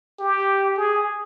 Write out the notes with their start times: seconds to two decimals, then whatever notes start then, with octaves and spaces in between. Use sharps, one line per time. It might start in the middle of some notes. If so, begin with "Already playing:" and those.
0.19 G4
0.77 G#4